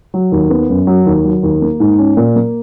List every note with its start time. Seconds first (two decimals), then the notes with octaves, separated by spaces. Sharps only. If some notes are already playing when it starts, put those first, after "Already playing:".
0.14 F#3
0.32 D#2
0.50 B3
0.69 F#2
0.87 F#3
1.06 D#2
1.24 F#3
1.43 D#2
1.62 A#3
1.80 G#2
1.98 C#4
2.17 A#2
2.36 A#3